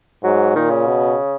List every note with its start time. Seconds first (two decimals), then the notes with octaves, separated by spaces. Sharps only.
0.23 G#2 F#3
0.55 A#2 D#3
0.71 C#3
0.87 B2